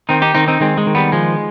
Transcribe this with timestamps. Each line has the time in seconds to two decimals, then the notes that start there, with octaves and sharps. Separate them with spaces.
0.09 D#3 C4 D#4
0.22 D#4 G4
0.34 D#3 C4 D#4
0.48 C4 D#4
0.60 D#3 G#3 C4
0.78 G#3
0.87 D#3
0.95 G3 B3
1.12 F3 G#3